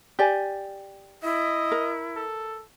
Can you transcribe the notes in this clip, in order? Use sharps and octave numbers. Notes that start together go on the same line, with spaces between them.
G4 D5 G#5
E4 D#5
A#4
A4